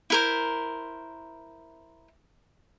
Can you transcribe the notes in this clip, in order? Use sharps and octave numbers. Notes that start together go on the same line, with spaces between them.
E4 A#4 C5